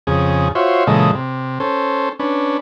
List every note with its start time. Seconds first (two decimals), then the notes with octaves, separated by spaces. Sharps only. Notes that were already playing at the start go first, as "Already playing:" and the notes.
0.07 F2 C#3 G#4
0.55 F4 F#4 C5 C#5 E5
0.87 A#2 C#3 E3 G#3 A4 D#5
1.15 C3
1.60 C#4 A4 C5
2.19 C#4 D4 B4